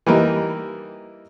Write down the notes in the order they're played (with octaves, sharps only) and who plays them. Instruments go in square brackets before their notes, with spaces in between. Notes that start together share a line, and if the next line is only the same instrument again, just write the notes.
[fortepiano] E3 G3 A#3 D#4